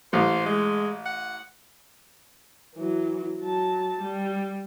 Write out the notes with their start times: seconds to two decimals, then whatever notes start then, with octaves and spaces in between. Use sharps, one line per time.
0.13 A1 C5
0.46 G#3
1.06 F#5
2.75 E3 F#3
3.40 F#3 A5
4.01 G3